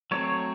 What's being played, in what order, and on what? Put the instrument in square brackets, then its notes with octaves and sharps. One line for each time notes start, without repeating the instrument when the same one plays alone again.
[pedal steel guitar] F#3 A3 C4 C#5